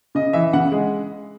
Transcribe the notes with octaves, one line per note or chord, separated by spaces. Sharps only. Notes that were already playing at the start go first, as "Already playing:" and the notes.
C#3 D#5
E3 E5
C#3 F#5
G#3